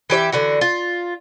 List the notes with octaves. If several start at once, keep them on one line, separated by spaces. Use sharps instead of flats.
E3 G4 C#5 E5
D3 E3 F#4
F4